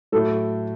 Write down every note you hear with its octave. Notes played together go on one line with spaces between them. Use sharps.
A2 F#3 A3 A4